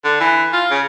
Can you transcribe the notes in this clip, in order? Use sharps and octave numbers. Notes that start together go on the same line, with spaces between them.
D3
E3
F4
C#3